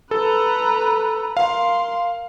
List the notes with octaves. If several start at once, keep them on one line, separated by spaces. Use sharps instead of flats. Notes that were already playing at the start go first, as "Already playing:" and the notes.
A4 B4 A#5
A#4 F5 C6